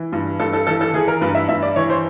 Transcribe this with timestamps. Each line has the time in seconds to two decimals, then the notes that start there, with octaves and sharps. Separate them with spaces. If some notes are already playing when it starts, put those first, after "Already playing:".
Already playing: E3
0.12 G2
0.40 G2 A4
0.53 A4
0.67 E3 A4
0.81 A4
0.94 E3 G#4
1.08 A#4
1.21 G2 B4
1.35 E5
1.49 G2 E5
1.62 D5
1.76 E3 C#5
1.90 C5